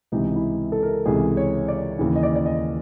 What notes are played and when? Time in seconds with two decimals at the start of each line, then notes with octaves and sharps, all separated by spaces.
0.12 C#2 C3 E3 D#4
0.36 E4
0.72 A4
0.83 A#4
1.05 C#2 C3 E3 G#4
1.37 C#5
1.68 D5
1.99 D#2 C#3 E3
2.16 D#5
2.23 D5
2.36 D5
2.46 D#5